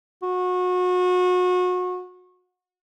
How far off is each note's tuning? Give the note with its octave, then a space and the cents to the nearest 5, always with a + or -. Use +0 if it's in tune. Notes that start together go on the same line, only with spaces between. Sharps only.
F#4 -30